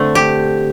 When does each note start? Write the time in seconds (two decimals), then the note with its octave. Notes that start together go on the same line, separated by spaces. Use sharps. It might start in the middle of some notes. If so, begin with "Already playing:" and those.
Already playing: D3 A3 C4
0.15 G4